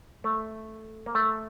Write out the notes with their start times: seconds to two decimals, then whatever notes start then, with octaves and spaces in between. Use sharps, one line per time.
0.24 A3
1.06 A#3
1.15 A3